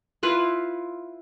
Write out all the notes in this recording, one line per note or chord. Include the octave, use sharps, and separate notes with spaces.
E4 F4 B4